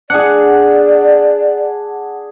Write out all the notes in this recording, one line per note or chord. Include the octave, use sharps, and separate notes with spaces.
D4 G#4 D5 F#5